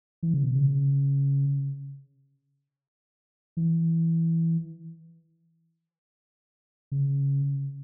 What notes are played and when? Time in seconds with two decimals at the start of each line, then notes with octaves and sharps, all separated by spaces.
0.23 E3
0.34 C#3
0.44 B2
0.55 C#3
3.57 E3
6.92 C#3